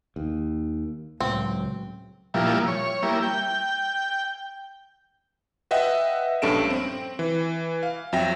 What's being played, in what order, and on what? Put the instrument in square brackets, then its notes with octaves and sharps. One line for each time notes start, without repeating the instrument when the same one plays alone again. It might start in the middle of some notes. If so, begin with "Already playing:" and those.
[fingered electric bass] D#2
[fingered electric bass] C#2 [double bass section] A2 F#3 [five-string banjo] C4
[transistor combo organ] A#2 F3 G3 E4
C#5
G3 A#3 E4
G5
[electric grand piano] B4 D#5 E5 F#5 G5
A#1 G2 C#4 A4 D7 E7
C4
E3
F5
F2 F#3 E5 G5 A#6